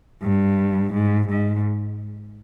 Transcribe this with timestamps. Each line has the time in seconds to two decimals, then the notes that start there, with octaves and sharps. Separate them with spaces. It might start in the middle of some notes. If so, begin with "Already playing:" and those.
0.23 G2
0.94 G#2
1.29 G#2